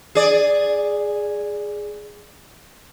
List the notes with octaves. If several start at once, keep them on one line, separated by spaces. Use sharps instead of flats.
G#4 D5